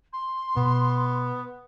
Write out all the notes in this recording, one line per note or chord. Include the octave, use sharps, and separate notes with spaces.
C6
B2 B3